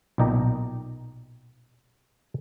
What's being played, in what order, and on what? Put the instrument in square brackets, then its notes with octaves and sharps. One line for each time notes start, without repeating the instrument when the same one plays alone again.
[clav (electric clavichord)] B1 A#2 D#4 D5 G5 A#5